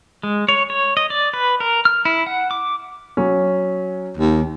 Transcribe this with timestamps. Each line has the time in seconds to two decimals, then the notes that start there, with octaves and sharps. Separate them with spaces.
0.23 G#3
0.49 C#5
0.70 C#5
0.97 D#5
1.10 D5
1.34 B4
1.60 A#4
1.85 F6
2.05 E4
2.26 F#5
2.51 D6
3.17 F#3 C#4
4.17 D#2